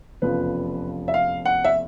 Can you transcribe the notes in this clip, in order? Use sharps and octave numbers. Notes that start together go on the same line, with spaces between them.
F1 E2 C#3 F3 B4
E5
F5
F#5
E5